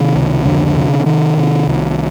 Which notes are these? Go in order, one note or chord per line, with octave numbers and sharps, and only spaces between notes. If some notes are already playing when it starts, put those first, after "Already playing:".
Already playing: C3 D#3
C#2
F2 D3
C3
C3 D#3
C3
C2